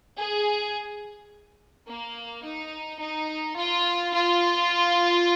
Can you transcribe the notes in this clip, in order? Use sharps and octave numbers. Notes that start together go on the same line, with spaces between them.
G#4
A#3
D#4
D#4
F4
F4